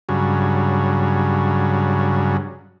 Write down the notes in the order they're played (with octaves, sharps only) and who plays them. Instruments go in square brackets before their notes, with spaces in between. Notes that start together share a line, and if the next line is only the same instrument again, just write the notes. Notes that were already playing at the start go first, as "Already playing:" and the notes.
[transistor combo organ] G2 C#3 F#3